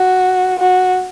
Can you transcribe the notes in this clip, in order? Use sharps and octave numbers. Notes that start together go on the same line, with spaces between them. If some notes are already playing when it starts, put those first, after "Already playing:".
Already playing: F#4
F#4